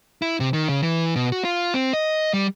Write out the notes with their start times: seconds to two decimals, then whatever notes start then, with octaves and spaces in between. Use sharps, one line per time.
0.22 E4
0.40 C3
0.53 D#3
0.68 C#3
0.83 E3
1.16 B2
1.32 F#4
1.45 F4
1.74 C4
1.93 D#5
2.33 G3